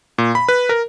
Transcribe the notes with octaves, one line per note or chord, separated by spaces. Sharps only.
A#2
B5
B4
A#4